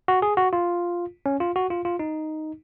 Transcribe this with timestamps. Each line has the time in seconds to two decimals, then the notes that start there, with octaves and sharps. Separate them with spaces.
0.08 F#4
0.22 G#4
0.37 F#4
0.53 F4
1.26 C#4
1.40 F4
1.56 F#4
1.70 F4
1.85 F4
1.99 D#4